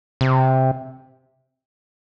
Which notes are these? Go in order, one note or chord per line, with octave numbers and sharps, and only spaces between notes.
C3